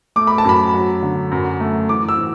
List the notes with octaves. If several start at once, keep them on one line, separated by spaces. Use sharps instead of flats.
A3 D6
B5
A5
F#2 B5
F#3
D3
F#2
A3
E3 D6
E6
E3